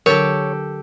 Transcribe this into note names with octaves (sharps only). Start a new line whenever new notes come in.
D3 F#3 D4 G4 A4 A#4 C#5